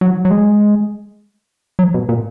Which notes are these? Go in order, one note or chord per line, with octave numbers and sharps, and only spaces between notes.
F#3
F#3
G#3
F#3
B2
A#2